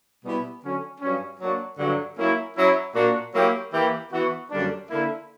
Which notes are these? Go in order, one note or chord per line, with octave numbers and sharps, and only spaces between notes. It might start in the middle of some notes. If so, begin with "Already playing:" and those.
B2 G3 B3 E4 G4
D3 F#3 C#4
G2 F#3 C#4
F#3 A#3 D4 F#4
G2 D3 F#3
F#3 A#3 C#4 E4
F#3 C#4 E4
A#2 A#3 D4 F#4
F#3 A#3 E4 G4
E3 A#3 E4 G4
E3 B3 F#4
F#2 D3 G3 A#3 D4
D3 A#3 E4